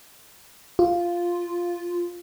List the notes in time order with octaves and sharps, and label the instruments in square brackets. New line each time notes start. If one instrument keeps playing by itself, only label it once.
[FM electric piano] F4